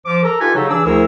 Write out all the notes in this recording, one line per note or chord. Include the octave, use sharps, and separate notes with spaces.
F3 D6
A4 A#4 A#5
D#4 F4 G4 A4 B4 G#5
C#3 F#3 D#4 F#4 G4 A4
E3 D4 G#4 D6 E6
D2 F3 E4 G#4 A#4 E6